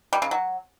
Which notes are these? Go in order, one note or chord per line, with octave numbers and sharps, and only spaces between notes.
G3
C#3
F#3